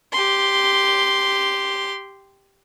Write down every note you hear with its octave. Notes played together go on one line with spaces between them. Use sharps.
G4 C6